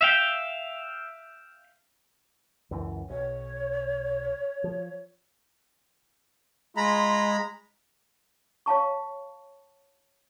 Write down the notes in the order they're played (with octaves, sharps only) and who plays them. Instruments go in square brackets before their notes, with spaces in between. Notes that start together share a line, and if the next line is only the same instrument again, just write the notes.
[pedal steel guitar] E5 F5 G5
[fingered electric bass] C#2 F#2 E3
[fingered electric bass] B1 [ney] C#5
[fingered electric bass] F3
[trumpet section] G#3 [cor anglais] F4 [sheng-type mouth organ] A#5 B5
[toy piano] C#5 F5 A5 C#6